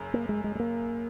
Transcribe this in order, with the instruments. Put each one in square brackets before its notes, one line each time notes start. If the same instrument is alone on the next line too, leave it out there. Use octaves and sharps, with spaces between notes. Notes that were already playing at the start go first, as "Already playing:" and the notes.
Already playing: [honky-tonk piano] F#1 F#2
[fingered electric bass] A#3
G#3
G#3
G#3
A#3